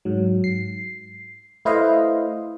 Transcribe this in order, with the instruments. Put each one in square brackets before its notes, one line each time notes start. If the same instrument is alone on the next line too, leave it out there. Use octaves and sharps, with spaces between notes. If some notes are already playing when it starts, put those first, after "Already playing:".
[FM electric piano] G#2 F#3
C7
A3 E4 B4 C5 D#5 F5